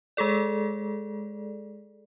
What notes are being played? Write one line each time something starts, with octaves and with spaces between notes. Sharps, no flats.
G#3 G#4 A4 D5